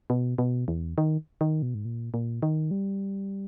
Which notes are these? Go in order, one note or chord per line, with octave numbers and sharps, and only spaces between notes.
B2
B2
E2
D#3
D#3
B2
G#2
A#2
A#2
D#3
G3